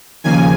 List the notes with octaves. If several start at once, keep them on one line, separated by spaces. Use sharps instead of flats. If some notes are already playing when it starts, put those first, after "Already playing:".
D#2 C#3 F3 A#3 G#5